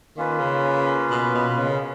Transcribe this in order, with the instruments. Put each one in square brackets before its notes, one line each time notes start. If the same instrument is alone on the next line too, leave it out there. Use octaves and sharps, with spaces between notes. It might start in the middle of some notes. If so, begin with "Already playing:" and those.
[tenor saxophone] D#3 [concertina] A#3 C#4 F4 B4
[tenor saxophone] C#3
B2
B2
C#3